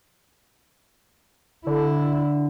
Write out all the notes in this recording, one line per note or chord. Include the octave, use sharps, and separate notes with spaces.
D3 E4